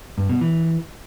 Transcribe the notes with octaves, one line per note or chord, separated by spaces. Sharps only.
G2
B2
E3